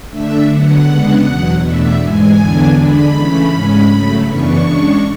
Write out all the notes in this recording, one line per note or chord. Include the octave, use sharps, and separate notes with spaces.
D3 A3 D4 E5
D3 F#3 B3 F#5
C#3 G#3 B3 D4
E2 B2 F#3
E2 B2 A3 D4 E5
G#2 E3 G#3 G#5
E2 D3 F#3 B3 D4
D3 G#3 D4 B5
C#3 E3 A3 C#4
G#2 G#3 C#4
C#3 F#3 A3
F#2 C#3 E3 B3 D4 C#6
C#3 G#3 D4